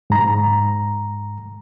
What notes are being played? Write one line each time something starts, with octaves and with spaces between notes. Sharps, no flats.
G#2 A#5